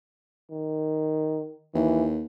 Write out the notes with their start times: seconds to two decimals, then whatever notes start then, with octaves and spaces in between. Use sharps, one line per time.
0.51 D#3
1.75 D#2 E3